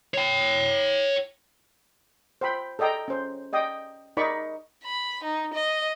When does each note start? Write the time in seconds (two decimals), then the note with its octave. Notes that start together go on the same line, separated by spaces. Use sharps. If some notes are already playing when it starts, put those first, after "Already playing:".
0.14 C#5 G5
2.41 C5 G5 B5
2.79 A4 D5 D#5 G5 A#5
3.08 C#4 C5
3.53 D5 D#5 G5 D#6
4.17 D#4 A#4 D5 B5 C#6
4.84 B5
5.23 D#4
5.54 D#5